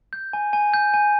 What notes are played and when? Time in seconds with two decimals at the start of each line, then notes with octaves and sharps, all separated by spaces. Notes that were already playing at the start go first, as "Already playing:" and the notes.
0.13 G6
0.33 G#5
0.53 G#5
0.74 G6
0.94 G#5